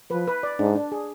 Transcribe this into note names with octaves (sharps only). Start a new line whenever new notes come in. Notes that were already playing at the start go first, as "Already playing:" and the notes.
F3 B4
B4
D5
G#2 D4
D4
G#4